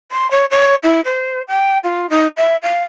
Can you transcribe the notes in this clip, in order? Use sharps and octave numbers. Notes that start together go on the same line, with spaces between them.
C6
C#5
C#5
E4
C5
G5
F4
D#4
E5
F5